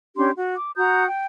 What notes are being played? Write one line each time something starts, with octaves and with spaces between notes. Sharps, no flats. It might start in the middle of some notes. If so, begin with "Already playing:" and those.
C#4 D4 G4 C6
F#4
D6
F#4 A#5 D#6 G6
G5